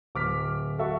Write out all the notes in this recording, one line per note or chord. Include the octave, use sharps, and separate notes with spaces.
D1 D6 F6 B6
F#4 A4 E5 F#5 C#6